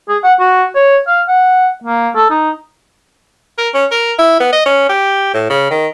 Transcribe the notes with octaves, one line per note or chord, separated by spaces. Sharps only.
G#4
F#5
F#4
C#5
F5
F#5
A#3
A4
D#4
A#4
C#4
A#4
E4
B3
D#5
C#4
G4
A2
C#3
D#3